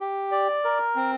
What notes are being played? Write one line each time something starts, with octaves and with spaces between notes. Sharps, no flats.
G4
D5
A#4
C4